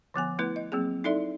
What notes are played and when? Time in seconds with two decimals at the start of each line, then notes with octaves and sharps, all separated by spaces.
0.14 D3 F3 B3 G#5
0.39 A3 B3 E4 B4
0.56 D#5
0.72 F#3 A#3 C4 G#4
1.04 D#4 E4 A4 D5 E5